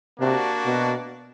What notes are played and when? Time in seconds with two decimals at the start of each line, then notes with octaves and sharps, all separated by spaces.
0.20 C3 A#3 D4 F#4
0.66 B2